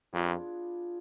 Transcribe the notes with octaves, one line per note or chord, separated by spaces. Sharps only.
F2 B3 D4 F4 G#4